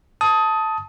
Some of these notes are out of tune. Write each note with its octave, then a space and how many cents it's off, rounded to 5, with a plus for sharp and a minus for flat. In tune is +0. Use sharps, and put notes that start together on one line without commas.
A5 +0 D#6 +20